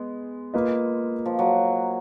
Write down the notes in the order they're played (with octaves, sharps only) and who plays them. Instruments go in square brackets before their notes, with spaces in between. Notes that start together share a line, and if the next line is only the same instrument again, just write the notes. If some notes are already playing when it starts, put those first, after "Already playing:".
Already playing: [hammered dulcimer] G#3 [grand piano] B3
[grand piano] A#3 F4 B4 D#5
[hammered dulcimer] F3
F#3